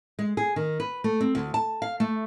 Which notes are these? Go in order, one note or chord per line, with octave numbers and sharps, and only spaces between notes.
G#3
G#4
D#3
B4
A3
C4
D2
A5
F5
A3